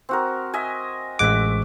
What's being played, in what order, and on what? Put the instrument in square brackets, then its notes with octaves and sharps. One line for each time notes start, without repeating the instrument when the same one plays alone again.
[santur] C4 F#4 A#4
D#5 E5 G#5
[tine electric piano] A1 G#3 D6 [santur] E5 F#5